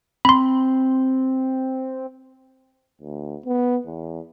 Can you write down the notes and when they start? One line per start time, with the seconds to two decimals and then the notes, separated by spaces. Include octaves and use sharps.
0.25 C4 B5 C6
3.02 D2
3.46 B3
3.86 E2